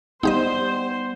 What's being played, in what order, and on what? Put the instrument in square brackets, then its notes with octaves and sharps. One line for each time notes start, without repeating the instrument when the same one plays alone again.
[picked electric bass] G3 A3 B3 [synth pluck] D#4 G4 D#5 [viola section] C5